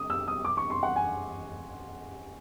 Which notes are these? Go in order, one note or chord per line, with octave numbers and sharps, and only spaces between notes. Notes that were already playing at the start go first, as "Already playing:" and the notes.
Already playing: D6 D#6
E6
D#6
D6
C#6
C6
F#5
G#5